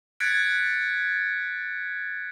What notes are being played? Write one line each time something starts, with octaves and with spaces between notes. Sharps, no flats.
F#6 G#6 A6 B6 C#7 D7